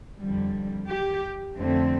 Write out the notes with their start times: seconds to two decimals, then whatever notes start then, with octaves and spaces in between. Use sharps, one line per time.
0.21 F2 D3 G3
0.89 G4
1.58 F2 D3 A3 C4